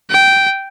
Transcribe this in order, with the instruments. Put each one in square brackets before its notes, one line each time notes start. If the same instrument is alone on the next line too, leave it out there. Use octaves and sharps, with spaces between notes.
[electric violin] G5